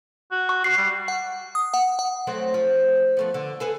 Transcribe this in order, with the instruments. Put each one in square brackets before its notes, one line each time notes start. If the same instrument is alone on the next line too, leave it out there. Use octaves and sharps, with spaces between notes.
[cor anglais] F#4
[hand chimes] C#6
[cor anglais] F#4 [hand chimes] C7
[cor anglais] G3
[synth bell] F#5
D#6
F#5
F#5
[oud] F#3 A3 C4
F3
F3 A3 B3
D3
G#4 A4 B4